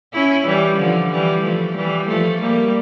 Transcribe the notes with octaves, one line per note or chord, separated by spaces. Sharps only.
C#4 E4
E3 G3
D3 F3
E3 G3
F3 A3
E3 G3
F3 A3
G3 A#3